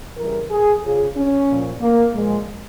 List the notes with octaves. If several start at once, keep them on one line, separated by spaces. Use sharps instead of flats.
C#3 E3 G3 A#4
G#4
C#3 F3 G#4
C#4
A#2 F3
A#3
A#2 F3 G#3